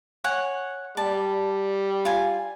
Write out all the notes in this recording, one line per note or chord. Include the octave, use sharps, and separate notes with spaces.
C#5 F#5 G#5
G3 A5
F4 G#5